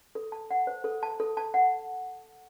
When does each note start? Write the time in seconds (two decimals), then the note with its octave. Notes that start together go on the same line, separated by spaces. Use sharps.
0.15 A4
0.32 A5
0.51 F#5
0.67 C5
0.84 A4
1.03 A5
1.20 A4
1.37 A5
1.54 F#5